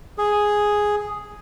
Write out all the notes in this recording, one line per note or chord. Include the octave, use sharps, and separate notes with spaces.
G#4